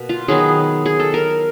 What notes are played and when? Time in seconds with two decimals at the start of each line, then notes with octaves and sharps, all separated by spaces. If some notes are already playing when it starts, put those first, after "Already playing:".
Already playing: B2 A#3
0.09 F4
0.28 D#3 F#3 B3 G#4
0.86 G#4
1.00 A4
1.14 A#4